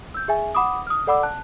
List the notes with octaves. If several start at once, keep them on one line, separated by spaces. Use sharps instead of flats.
E6 G6
G#4 E5 G#5
F#5 B5 D6 D#6
D#6 F6
A4 D5 F#5 B5 D6 E6
A5 F#6